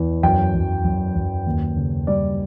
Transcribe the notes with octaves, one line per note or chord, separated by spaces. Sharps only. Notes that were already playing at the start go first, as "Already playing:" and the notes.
Already playing: E2 E3
F#2 G5
F#2
F#2
F#2
D#2
C#3
G3 D5